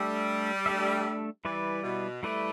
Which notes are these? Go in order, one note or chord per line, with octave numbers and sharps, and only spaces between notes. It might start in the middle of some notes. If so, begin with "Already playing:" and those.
Already playing: G3 A3 D4 A4 E5
A3 D4 A4 E5
E3 G3 E4 B4 D5
B2
G3 A3 E4 B4 D5